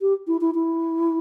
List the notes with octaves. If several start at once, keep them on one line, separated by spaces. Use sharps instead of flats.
G4
E4
E4
E4